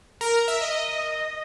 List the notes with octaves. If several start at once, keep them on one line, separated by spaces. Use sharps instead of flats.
A#4
E5
D#5